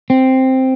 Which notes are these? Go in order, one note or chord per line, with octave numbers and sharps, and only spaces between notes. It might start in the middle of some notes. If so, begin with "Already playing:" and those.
C4